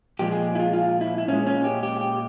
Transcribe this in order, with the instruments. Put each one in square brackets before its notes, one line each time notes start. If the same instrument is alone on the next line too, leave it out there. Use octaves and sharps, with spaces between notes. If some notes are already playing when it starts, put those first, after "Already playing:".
[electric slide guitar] A#2 F3 G#3 G4
G#4
E4
F4
F4
E4
E4
A#2 G#3 C#4
C#4
G4
G4
G4